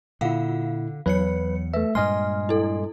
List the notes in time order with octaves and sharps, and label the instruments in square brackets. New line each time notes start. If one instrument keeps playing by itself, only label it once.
[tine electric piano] A#2 E4 [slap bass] D3 [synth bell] F4 F5 F#5
[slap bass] E2 [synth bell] F#3 C#5 C#7 [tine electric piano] B4
[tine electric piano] A3 E5 [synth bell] B4
[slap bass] G2 A#2 G#3 [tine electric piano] D#5 G#5 C6 [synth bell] F6
[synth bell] E4 A4